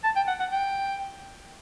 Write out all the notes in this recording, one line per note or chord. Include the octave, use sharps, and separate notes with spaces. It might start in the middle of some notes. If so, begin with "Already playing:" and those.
A5
G5
F#5
F#5
G5